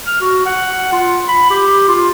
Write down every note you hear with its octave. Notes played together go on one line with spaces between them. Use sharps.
F6
F#4
F#5
F4
B5
G4
F4